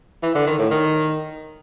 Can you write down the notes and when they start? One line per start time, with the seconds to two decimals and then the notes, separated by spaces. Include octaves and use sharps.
0.23 E3
0.35 D3
0.47 D#3
0.59 A2
0.71 D#3